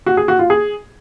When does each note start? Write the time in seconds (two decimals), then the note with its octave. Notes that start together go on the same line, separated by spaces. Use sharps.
0.06 F#4
0.17 G#4
0.28 F#4
0.39 F4
0.50 G#4